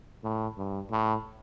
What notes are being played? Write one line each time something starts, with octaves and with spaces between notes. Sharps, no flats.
A2
G2
A2